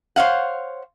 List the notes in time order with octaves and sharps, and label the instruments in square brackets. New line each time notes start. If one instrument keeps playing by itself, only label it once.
[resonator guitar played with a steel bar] C5 C#5 F5 F#5